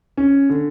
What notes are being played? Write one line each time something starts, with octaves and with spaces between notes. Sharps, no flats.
C#4
D3